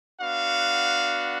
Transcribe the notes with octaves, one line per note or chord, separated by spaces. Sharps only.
B3 D4 F#4 F5